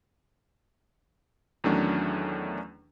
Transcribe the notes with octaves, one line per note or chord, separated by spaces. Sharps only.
E2 D#3 F#3 A3 C#4 D4